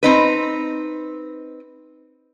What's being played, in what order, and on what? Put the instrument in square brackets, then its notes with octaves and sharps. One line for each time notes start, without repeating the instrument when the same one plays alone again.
[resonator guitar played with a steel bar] C4 D#4 B4